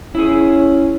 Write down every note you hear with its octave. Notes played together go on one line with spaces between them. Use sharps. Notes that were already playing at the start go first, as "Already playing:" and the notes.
C#4 E4 G#4